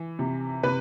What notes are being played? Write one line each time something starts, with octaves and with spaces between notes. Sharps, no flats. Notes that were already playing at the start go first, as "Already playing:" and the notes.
Already playing: E3
C3
C3 B4